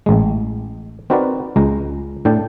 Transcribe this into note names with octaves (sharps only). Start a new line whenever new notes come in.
A1 G#3
C4 D#4 F#4 A#4 B4 D5
C#2 G#3 A#5
A2 D4 G5 A5